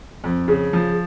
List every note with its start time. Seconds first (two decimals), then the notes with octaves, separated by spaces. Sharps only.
0.24 F2
0.48 C#3
0.73 F3